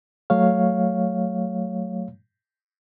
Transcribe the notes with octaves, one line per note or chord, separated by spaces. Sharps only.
F#3 A3 C#5 F5